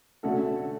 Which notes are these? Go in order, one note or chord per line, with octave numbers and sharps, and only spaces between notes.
D3 A3 C#4 F#4 A4